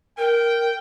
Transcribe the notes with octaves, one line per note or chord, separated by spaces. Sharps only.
A#4 G5